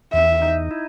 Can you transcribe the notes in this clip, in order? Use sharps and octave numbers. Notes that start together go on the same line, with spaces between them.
E2 E5
D#4
E4